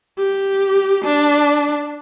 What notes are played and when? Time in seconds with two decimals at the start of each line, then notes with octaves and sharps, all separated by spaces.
0.18 G4
1.05 D4